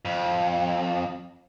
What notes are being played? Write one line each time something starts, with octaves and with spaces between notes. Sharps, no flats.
F2